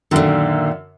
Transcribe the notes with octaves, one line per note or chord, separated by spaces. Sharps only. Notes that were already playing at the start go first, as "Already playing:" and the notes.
F#2 A#2 D3 D#3